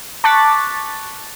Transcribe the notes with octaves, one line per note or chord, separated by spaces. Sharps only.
A5 C#6 D6 F#6 A6 B6